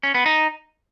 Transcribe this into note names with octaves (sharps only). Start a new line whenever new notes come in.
C#4
B3
D#4